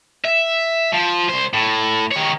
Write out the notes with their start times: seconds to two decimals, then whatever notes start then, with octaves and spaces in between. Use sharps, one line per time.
0.25 E5
0.94 F3
1.29 C2 C5
1.54 A2
2.11 D#3 C#5